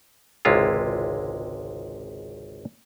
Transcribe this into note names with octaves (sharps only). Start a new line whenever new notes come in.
G#1 C#2 C3 G#3 E4 F4